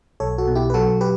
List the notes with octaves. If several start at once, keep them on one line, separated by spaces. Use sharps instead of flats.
B1 A4 C#5
F#4 A4
B2
E4 G4
B4
F#3 F#4 A4
G4 B4